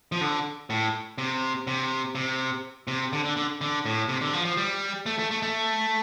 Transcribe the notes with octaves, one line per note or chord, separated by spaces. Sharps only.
F3
D3
A2
C3
C3
C3
C3
D3
D3
D3
D3
A2
C3
D3
F3
F3
G3
A3
A3
A3
A3